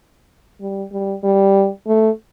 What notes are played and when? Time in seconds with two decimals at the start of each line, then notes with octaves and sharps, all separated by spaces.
0.61 G3
0.92 G3
1.23 G3
1.87 A3